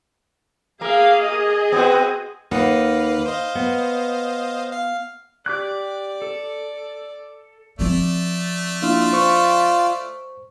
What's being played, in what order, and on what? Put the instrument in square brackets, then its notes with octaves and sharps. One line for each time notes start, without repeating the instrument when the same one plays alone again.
[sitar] A#3 A#4 [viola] G#4 F5
[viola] G#4 D#5
[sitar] B3 C4 F#4
[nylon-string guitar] D#2 D#4 F#5 [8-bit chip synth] A#3 B4 F5
[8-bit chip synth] C5 D#5 F5
[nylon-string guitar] B3
[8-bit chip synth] F5
[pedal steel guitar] G4 D6 F#6 [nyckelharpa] D5
[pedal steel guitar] A4
[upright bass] F3 C4 [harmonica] A3 D5
[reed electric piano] A#3 D4 E4 [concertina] F4 F5
[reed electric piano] C5 C#6